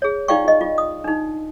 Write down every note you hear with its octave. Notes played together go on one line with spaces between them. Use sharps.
G#4 C#5
D#4 F4 D5 F5 G5 C#6
F4 D#5
F4
D#6
D4 D#4